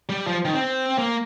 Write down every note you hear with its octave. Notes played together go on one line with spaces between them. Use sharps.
G3
F3
D#3
C4
A#3